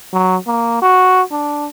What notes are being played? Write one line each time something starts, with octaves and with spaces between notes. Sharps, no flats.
F#3
A#3
F#4
D4